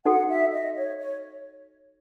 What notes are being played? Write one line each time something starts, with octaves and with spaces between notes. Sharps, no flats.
D#4 F#4 A4 F#5
E5
D#5
C#5
C#5